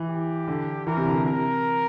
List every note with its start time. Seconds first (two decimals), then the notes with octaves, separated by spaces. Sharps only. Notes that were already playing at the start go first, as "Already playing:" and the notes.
Already playing: E3
0.08 G4
0.48 D3
0.87 E3 A#4
0.97 C3
1.06 D3
1.25 C3 A#4